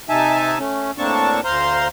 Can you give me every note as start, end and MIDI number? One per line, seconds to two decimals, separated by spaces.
0.09 0.58 48
0.09 0.58 63
0.09 0.58 76
0.09 0.58 80
0.09 0.58 81
0.59 0.91 57
0.59 0.91 61
0.98 1.41 45
0.98 1.41 58
0.98 1.41 60
0.98 1.41 62
0.98 1.41 81
0.98 1.41 85
1.44 1.88 38
1.44 1.88 72
1.44 1.88 77
1.44 1.88 82
1.44 1.88 84